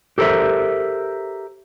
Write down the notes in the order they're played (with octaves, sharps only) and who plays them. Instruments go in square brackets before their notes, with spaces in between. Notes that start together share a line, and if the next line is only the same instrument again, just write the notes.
[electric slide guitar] G4 A4 A#4 C5 E5